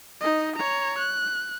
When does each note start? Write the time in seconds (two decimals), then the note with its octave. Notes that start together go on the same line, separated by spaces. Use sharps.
0.21 D#4 D#5
0.56 C#5 A#5
0.99 F#6